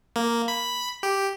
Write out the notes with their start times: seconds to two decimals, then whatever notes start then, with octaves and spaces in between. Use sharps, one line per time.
0.16 A#3
0.48 B5
1.03 G4